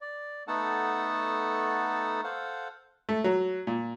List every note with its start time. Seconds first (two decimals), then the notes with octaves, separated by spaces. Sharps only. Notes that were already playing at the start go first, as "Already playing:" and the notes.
0.01 D5
0.48 A3 B3 D#4 A4 F#5 A5
2.24 A4 C5 F5 F#5
3.09 A3
3.24 F#3
3.67 A#2